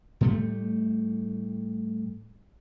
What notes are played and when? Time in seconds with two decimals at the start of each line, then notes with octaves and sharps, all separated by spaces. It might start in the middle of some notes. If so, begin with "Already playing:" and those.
0.21 A2 G3 A3